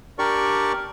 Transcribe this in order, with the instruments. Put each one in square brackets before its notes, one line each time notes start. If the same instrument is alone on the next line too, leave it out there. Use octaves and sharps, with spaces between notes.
[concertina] D4 G4 A#4 D5 C#6